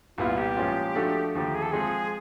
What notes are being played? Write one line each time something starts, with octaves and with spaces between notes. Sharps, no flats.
C2 A#2 G3 B3 E4 F4
G4
A#2 F3 G#3 C#4 F4
F3 A3 D4 F#4 A4
D#2 D3 F3 A3 G4
G#4
A4
F3 G#3 C4 G#4